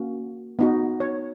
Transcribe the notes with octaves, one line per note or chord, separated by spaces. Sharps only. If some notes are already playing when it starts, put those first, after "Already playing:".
Already playing: A#3 C#4 F#4
B3 D#4 F#4
C#5